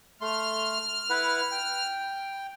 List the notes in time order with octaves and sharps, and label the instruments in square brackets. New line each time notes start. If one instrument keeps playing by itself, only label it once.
[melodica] A3 C6 [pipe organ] F6
[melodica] E4 B4 F#5
G5